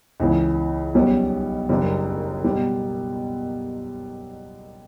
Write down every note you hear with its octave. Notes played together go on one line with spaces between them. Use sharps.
C#2 C#3 E3
B1 B2 G3 C#4
F#1 F#2 C#3 G3 D4
B2 G3